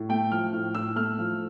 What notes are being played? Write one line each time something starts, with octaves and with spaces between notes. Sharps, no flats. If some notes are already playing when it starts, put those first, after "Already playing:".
Already playing: A2
A3 G5
F3 F6
A2
A2 E6
A3 F6
F3